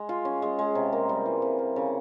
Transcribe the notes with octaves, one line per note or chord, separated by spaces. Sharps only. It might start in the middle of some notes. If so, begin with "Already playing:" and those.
Already playing: G#3
F4
C#4
G#3
G#3
C3
A#3
G3
E3
C3
A#3
C#3